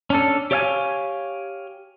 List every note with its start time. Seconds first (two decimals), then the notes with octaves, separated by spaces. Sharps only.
0.10 C#4 D4 A4
0.51 G4 C#5 D5 E5 F5 G#5